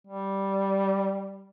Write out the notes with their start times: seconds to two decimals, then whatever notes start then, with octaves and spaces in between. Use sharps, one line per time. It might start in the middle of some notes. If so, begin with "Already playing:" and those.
0.07 G3